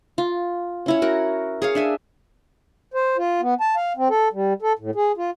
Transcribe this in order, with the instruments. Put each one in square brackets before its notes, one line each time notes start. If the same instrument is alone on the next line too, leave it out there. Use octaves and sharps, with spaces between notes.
[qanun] F4
C#4 E4 C#5
F#4 A#4
G#4 C#5 F5
D4 E5 G#5
[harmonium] C5
F4
B3
A5
F5
C4
A4
G3
A4
A2
G#4
F4